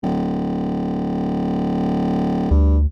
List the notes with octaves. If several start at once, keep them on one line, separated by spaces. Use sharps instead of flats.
D1
D2 G2